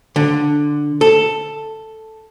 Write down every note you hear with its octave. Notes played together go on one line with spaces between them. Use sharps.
D3
A4